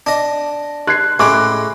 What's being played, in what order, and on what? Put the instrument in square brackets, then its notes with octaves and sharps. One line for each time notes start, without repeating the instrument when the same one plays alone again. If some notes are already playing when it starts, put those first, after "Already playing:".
[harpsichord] D4 D#5
[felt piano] F#6 G#6 C7
[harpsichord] A2 G#3 C#4 [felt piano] B5 D6 F#6